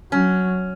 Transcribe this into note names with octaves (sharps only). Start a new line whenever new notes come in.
F#3 C#4